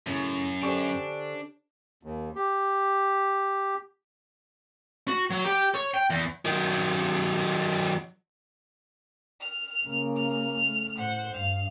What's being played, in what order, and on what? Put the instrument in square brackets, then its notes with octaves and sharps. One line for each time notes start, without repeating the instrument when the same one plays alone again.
[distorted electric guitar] F#2 [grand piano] A2 C#3
[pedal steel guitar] D3 G#5 C#6 [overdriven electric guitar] D4 [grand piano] G4 A4 C5
[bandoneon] D#2
G4
[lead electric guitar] F#4
F#3
G4
C#5
G5
E2
D#3 F#3
[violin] F6
[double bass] C#3 A#3
[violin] F6
[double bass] A3
[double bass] A2 [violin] C5 F#5
[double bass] G2 [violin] F5